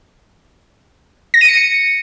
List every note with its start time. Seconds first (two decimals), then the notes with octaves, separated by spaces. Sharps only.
1.34 A#6
1.41 D#7
1.48 C#7